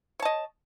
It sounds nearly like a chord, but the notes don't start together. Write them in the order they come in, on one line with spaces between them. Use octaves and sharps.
C#5 A5 D#5